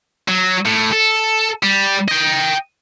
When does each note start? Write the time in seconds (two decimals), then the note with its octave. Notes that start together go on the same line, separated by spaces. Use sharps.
0.28 F#3
0.66 A2
0.93 A4
1.63 G3
2.08 D#5 G5